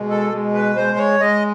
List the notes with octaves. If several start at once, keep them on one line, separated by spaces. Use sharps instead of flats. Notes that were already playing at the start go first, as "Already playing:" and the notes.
Already playing: B2 G#3
A4
G#3
B4
G#3 C5
C#5
G#3 D#5